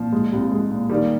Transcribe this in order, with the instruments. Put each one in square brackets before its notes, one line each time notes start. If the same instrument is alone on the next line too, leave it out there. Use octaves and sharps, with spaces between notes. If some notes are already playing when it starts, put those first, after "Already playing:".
Already playing: [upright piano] A#2 [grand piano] F3
[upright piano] G#3
C2
G#3
A#2
[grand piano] D#3 G3 [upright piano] A#3